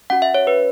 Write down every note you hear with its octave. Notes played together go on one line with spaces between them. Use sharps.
C#4 F#4 F#5
E5
C#5
B4